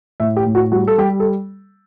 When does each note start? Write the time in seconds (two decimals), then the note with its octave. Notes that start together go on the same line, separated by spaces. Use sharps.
0.20 A2 E5
0.37 G4
0.46 A2
0.55 F#4
0.72 G3 F#4
0.88 A4
0.98 G3 G4
1.20 A4